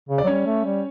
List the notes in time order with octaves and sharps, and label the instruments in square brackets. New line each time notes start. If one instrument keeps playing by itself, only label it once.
[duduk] C#3
[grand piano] D5
[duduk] F#3
[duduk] G3 [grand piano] C#4 C#5
[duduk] A3
G3